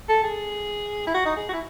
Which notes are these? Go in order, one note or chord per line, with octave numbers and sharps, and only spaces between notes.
A4
G#4
E4
F#4
D#4
G#4
F#4
E4